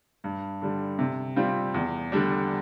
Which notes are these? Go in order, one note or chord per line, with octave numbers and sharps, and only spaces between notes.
G2
D3 G3
C3
G3 C4 F4
E2
D3 G3 D4